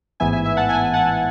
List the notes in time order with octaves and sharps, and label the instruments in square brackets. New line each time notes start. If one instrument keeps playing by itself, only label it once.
[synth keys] A1 G#2 E3 B3 E5 G#5
E5 G#5
E5 G#5
F#5 A5
E5 G#5
F#5 A5